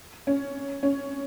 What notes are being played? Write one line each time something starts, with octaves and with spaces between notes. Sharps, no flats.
C#4
C#4